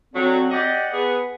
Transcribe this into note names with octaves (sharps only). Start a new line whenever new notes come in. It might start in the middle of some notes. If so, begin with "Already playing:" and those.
D3 F#3 C4
G4 D5 D#5 F#5
B3 G#4